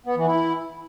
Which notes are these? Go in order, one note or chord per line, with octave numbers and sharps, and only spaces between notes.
B3
E3
E4